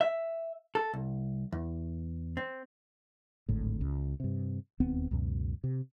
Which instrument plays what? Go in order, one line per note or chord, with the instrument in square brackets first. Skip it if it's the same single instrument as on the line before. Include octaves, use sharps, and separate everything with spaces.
[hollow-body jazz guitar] E5
A4
C2
E2
C4
[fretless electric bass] D1 G#1 D2 A2
C#2
G2 C3
E1 D#2 B3 C4
C#2 F#2 B2
C3